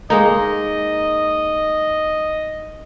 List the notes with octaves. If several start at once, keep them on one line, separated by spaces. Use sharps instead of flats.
G#3 A#3 D#4 D#5